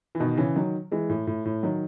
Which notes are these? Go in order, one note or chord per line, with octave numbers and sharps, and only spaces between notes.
E3
B2 D#3
C#3 E3
D#3 F#3
E3 G#3
A2
A2
A2
D#3 F#3